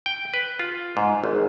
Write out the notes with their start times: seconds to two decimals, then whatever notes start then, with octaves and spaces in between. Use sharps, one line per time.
0.06 G5
0.34 B4
0.59 F4
0.97 G#2
1.24 G#1